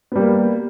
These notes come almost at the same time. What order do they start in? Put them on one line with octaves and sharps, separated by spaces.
B3 G3 A#3